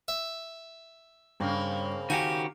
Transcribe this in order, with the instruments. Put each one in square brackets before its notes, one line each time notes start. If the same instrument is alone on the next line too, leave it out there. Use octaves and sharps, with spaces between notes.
[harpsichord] E5
[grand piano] G2 [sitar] C#3 A#3 C4
[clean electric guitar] D#3 F#4 G4 [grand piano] F5 [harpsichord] G#5